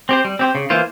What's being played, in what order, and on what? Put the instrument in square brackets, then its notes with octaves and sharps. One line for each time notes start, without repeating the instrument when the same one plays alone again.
[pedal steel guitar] C4 G4 C5
G3
C4 G4 C5
C#3
E3 A#3 F4 C5